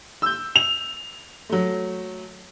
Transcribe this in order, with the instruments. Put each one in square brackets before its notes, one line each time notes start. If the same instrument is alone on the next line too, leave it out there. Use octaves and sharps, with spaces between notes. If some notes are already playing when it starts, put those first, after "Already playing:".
[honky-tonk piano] E6 G6
[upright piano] F7
[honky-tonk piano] F#3 A3